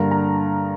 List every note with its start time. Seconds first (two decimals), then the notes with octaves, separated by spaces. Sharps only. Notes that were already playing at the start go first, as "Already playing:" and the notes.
Already playing: G2 D3 G3 A#3 A#5
0.11 A#5